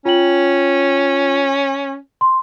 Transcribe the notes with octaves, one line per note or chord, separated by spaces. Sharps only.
C#4 F4 G5 F#7
C6